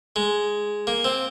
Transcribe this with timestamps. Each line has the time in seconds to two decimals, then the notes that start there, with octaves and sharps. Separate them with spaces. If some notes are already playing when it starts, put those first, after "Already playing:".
0.16 G#3
0.87 A#3
1.04 C4